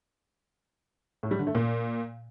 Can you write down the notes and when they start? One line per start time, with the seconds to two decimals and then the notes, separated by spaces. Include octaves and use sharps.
1.23 A2
1.31 G3
1.39 D3
1.47 A3
1.55 A#2